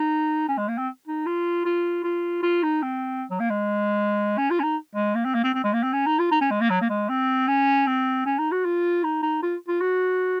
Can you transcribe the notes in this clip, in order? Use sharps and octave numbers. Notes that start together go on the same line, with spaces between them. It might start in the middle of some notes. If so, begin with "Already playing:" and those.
Already playing: D#4
C#4
G#3
A#3
C4
D#4
F4
F4
F4
F4
D#4
C4
F#3
A#3
G#3
C#4
F4
C#4
D#4
G#3
A#3
C4
A#3
C4
C4
G#3
A#3
C4
C#4
D#4
F4
D#4
C#4
G#3
A#3
F#3
A#3
G#3
C4
C#4
C4
C#4
D#4
F#4
F4
D#4
D#4
F4
F4
F#4